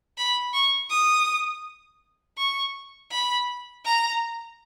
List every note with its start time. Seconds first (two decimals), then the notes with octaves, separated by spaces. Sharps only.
0.18 B5
0.54 C#6
0.90 D#6
2.38 C#6
3.11 B5
3.85 A#5